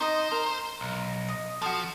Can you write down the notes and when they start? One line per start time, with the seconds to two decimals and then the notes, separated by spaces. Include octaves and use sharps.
0.01 D#4 C5 D#5
0.32 A#4
0.81 B1
1.29 D#5
1.62 F3 F#4 A4